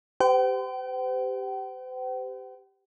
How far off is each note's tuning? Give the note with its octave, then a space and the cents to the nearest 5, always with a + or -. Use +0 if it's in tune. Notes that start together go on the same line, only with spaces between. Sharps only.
G4 +0 C5 -40 G5 -45